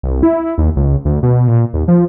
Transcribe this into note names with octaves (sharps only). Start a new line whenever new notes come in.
C2
E4
D#2
C#2
D2
B2
A#2
D#2
F3